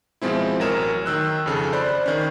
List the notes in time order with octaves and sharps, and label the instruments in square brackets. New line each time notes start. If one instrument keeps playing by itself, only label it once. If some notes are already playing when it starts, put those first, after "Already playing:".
[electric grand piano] B2 F3 G#3 C4 E4
A1 F#3 A#4 C#5 E7
D#3 E6 F#6
F2 C#3 A4
C5 D5 B5 F#6
D#3 C#4